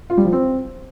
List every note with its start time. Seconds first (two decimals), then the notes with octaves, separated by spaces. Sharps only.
0.10 F4
0.17 G3
0.25 F3
0.33 C4